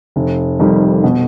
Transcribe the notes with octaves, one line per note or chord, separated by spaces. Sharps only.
F1
F2 D#3 G3
B2